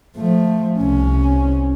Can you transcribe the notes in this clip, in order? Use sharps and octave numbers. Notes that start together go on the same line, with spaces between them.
F3 A3
C2 C#4